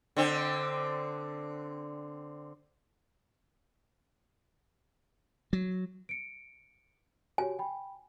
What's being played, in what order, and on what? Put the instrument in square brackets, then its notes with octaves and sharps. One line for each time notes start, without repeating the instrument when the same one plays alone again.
[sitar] D3 C4
[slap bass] F#3
[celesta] C#7 D7
[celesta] F#4 G4 C#5 [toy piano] G#5
[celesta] G5 B5